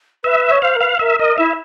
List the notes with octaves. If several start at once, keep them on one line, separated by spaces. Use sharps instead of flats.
B4 E5
C#5
C5 F5
A#4
B4 F5
A#4 E5
A#4 D#5
E4 E5